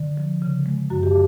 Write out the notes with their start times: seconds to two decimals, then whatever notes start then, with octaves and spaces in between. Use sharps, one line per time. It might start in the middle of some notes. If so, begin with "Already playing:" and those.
Already playing: D3
0.17 F3
0.42 C#3
0.66 G#3
0.90 F#2 F#4
1.03 G4